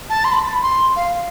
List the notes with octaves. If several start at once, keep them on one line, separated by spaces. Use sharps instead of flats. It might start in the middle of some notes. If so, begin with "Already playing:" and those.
A5
C6
B5
C6
F5